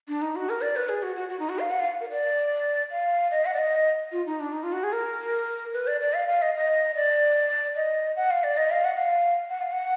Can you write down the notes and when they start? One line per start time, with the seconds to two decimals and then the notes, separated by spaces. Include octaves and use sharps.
0.08 D4
0.22 D#4
0.36 F#4
0.49 A#4
0.62 D5
0.76 B4
0.89 G#4
1.03 F#4
1.16 F#4
1.29 F#4
1.39 D#4
1.49 F#4
1.59 F5
1.70 F#5
1.80 F5
2.01 A#4
2.10 D5
2.91 F5
3.31 D#5
3.46 F#5
3.54 D5
3.58 D#5
4.12 F4
4.26 D#4
4.40 D4
4.53 D#4
4.63 F4
4.73 F#4
4.83 G#4
4.93 A#4
5.73 B4
5.87 D5
6.01 D5
6.14 F5
6.28 F5
6.42 D#5
6.55 D#5
6.95 D5
7.76 D#5
8.16 F#5
8.31 F5
8.44 D5
8.57 D#5
8.71 F5
8.84 F#5
8.98 F5
9.49 F#5
9.61 F5
9.72 F#5